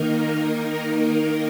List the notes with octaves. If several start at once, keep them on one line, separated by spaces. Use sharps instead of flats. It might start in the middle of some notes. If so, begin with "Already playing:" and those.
Already playing: D#3 A#3 D#4 A#4